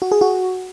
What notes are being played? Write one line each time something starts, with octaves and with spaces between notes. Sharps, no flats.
F#4
G#4
F#4